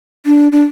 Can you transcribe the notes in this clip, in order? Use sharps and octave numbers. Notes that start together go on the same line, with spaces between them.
D4
D4